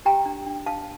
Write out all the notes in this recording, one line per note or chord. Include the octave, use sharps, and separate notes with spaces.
G4 G5 A#5
D4
D4
D4 F5 A5